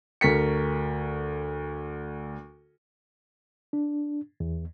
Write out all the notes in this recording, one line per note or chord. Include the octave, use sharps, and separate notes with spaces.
D2 A#4 B6 C#7
D4
E2